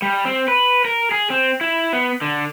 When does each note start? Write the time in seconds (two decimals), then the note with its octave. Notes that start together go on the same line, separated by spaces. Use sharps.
0.02 G3
0.25 C4
0.48 B4
0.85 A#4
1.11 G#4
1.30 C4
1.61 E4
1.93 B3
2.21 D3